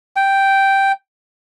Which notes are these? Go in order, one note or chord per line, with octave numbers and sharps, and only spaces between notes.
G5